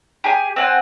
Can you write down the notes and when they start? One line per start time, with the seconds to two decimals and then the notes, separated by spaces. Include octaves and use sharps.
0.24 G4 G#4 G#5
0.56 C4 F#5 G#5